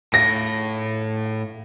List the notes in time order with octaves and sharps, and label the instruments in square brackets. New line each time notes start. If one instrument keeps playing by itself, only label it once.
[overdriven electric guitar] A2 [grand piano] A#6